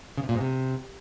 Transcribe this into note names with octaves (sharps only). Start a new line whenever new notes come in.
C#3
C3
A#2
G#2
C3